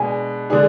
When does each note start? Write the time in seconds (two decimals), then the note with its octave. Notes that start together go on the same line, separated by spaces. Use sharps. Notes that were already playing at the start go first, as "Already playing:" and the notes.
Already playing: B2 G#3 D4 G#5
0.50 D3 G#3 D4 G#4